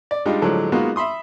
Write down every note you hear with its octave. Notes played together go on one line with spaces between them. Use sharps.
D5
G3 G#3 D4 D#4 F4
A2 D3 F3 F#3 G#3
G#3 A#3 B3 D#4 F4 F#4
E5 B5 C6 D#6